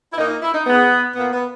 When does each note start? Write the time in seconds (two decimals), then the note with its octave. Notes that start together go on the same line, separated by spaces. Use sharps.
0.13 E4
0.18 A#2 A#3 D#4
0.30 D#4
0.42 E4
0.54 D#4
0.66 G#2 E3 G#3 B3
1.16 A#2 A#3 B3
1.32 B3